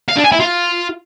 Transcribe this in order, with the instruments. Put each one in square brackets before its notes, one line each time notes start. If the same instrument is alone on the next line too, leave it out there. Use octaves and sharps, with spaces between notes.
[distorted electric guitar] F5
D4
G#5
E4
F4